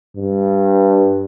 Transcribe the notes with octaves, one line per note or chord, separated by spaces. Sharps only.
G2